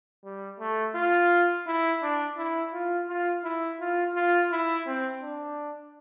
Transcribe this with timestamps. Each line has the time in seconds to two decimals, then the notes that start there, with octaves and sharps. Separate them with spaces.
0.24 G3
0.60 A3
0.95 F4
1.67 E4
2.02 D4
2.37 E4
2.73 F4
3.09 F4
3.44 E4
3.80 F4
4.15 F4
4.51 E4
4.86 C4
5.22 D4